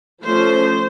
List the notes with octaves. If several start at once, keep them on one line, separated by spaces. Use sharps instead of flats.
F3 A3 C#4 C5